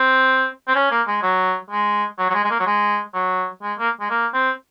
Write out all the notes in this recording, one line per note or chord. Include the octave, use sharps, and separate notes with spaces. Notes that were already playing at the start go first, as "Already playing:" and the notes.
Already playing: C4
C4
C#4
A#3
G#3
F#3
G#3
F#3
F#3
G#3
G#3
A#3
F#3
G#3
F#3
G#3
A#3
G#3
A#3
C4